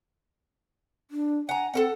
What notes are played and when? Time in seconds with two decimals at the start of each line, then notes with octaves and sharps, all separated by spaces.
1.11 D4
1.49 F#5 G#5 A#5
1.74 C4 A4 A#4 F#5